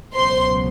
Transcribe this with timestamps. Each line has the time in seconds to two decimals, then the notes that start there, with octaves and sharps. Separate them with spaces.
0.14 C#2 B2 F#3 C5 C6